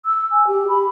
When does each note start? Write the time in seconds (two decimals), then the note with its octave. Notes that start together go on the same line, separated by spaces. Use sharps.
0.06 E6
0.32 G#5
0.47 G4
0.69 B5